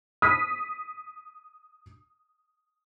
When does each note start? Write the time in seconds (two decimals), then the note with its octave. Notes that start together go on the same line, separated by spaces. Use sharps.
0.22 D#6 B6